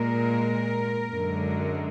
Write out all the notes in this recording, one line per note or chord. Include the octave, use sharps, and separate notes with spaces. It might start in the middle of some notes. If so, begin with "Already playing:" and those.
Already playing: A#2 G#3 A#4
F#2 D3 G#3